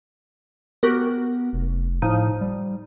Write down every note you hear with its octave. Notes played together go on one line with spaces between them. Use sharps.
B3 F#4 G4 A#4
F1
A2 F3 D#4
G3